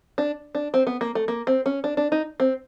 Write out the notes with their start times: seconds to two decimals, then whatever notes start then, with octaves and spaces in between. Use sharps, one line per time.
0.18 D4
0.55 D4
0.74 C4
0.87 B3
1.01 A#3
1.15 A3
1.28 A#3
1.47 C4
1.66 C#4
1.84 D4
1.97 D4
2.12 D#4
2.40 C4